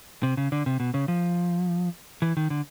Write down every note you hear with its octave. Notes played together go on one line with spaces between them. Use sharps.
C3
C#3
D3
C3
B2
C#3
F3
E3
D#3
D3